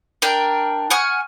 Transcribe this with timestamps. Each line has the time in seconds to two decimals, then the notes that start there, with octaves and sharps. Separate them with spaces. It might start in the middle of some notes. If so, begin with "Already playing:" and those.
0.22 D4 A#4 G5
0.90 F#5 G#5 C#6 F6